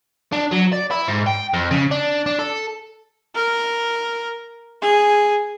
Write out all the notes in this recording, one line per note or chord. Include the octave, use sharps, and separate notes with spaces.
D4
F#3
D5
E4
G#2
G5
F2
C#3
D4
D4
A4
A#4
G#4